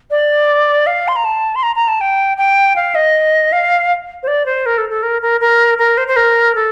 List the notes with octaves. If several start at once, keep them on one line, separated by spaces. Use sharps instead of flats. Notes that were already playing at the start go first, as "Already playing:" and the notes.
D5
F5
C6
A#5
A5
C6
A#5
A#5
A5
G5
G5
F5
D#5
F5
C5
D5
C5
A#4
A4
A4
A#4
A#4
A#4
A#4
C5
C5
A#4
A4